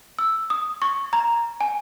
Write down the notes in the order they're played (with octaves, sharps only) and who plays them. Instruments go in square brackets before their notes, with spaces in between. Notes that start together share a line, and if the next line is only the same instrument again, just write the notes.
[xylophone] E6
D#6
C#6
A#5
G#5